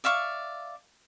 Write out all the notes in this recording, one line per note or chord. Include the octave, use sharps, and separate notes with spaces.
D5 E5 F5 C#6